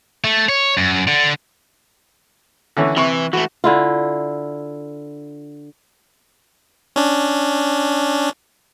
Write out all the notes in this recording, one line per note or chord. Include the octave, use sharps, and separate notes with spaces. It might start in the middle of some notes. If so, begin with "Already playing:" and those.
A3
C#5
F#2
D3
D3 E3 C#4
C3 E3 C#6
E3 A3 F#4
D3 E4 F4
C#4 D4